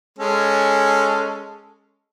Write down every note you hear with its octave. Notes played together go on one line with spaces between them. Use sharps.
G#3 C#4 A4